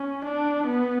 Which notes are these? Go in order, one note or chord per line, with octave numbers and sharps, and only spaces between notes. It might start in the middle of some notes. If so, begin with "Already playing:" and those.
Already playing: C#4
D4
B3